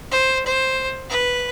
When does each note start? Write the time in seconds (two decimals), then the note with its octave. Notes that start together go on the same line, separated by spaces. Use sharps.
0.11 C5
0.46 C5
1.10 B4